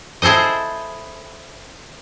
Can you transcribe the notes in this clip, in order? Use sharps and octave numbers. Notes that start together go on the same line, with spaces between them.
E4 G#4 A4 C5 D#5